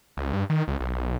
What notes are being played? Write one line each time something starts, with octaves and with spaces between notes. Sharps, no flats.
C#2
G2
D#3
C#2
B1